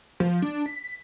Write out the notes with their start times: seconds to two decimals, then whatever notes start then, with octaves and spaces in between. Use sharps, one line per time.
0.20 F3
0.42 D4
0.66 B6